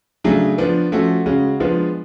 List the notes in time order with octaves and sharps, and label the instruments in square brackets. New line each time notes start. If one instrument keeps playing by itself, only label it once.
[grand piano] C#3 F#3 A3 D4 G#4
F3 B3 D4
F3 A3 C#4 F#4 A4
C#3 G#3 C#4 F#4
F3 G#3 B3 D4